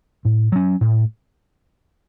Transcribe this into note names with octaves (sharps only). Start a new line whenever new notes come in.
A2
F#3 C#4
A2